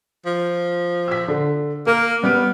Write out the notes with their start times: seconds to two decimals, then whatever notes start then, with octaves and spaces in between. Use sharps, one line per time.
0.26 F3
1.08 E6 B6
1.28 D3
1.87 A#3 A#4
2.23 G3 B3 F6 D7